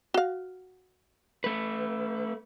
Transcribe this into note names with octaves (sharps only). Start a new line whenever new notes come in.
F#4 F5
A3 B4